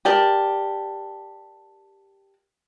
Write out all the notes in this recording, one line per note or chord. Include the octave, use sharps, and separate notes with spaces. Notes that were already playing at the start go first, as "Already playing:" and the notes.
G4 A#4 D5 A5